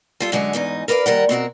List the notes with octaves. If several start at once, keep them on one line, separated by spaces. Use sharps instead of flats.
G3 F4 A4
F#2 D3 G#3 F#5 G#5
E2 G#2 D#4 G#5
A#4 B4 D5 E5 F5
D#2 G3 A#4 F#5
B2 C4 F#4 A#4